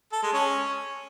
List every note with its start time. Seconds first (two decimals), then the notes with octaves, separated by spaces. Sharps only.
0.12 A4
0.23 G#3
0.33 C#4